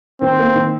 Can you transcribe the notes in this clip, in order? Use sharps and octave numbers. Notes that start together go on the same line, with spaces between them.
D#2 C4
A#3
D#3